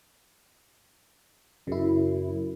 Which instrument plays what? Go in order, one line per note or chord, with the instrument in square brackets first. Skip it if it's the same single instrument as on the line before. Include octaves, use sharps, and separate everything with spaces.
[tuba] F#2 [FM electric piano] C#3 E4